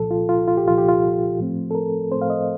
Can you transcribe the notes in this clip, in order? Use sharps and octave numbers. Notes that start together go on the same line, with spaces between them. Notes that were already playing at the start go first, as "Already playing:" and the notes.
Already playing: C2 A#2 F3 A4
F4
F4
F4
G4
C2 A#2 F3 F4
G4
F4
A2 F3 A3 C4
A4
A#4
A2 F3 A3 C4 C5
F5
D#5